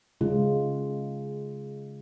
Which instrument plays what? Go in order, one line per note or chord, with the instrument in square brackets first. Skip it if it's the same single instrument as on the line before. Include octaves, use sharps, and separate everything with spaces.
[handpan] C#3 G#3 F4